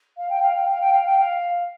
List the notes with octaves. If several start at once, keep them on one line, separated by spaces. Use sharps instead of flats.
F5
G5
F5
G5
F5
G5
F5
G5
F5